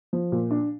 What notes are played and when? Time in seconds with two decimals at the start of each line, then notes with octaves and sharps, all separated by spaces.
0.13 F3
0.32 A#2
0.51 D4